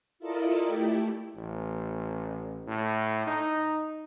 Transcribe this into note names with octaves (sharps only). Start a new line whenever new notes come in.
E4 F4 A4 A#4 D5 D#5
A3 E4 G4
A1
A2
D#4